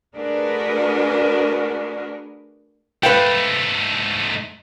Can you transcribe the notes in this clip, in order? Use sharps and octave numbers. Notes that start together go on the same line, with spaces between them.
A3 D4 F#4 G#4 A#4 B4
G#2 A3 B4 F5 G5